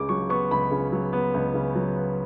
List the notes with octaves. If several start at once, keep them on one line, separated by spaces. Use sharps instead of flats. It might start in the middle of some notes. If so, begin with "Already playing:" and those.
Already playing: C#2 C#3 D6
F#3 C#6
B3 C#6
C#2 B5
C#3
F#3
B3
C#2
C#3
F#3
B3